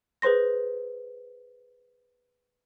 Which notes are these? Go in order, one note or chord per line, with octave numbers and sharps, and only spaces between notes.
G#4 B4 C5 C6 A#6